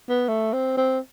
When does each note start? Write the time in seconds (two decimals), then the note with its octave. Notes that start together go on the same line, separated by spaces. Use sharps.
0.09 B3
0.29 A3
0.53 C4
0.77 C4